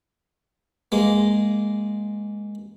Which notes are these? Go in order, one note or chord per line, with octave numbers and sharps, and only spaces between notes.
G#3 A#3